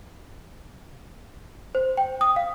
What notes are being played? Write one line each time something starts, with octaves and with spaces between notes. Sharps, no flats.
C5
G5
D#6
F5